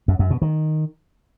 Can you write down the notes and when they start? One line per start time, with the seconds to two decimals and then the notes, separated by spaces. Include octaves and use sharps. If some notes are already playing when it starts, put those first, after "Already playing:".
0.08 F#2
0.19 F#2
0.30 B2
0.42 D#3